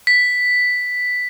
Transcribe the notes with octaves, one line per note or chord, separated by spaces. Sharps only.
B6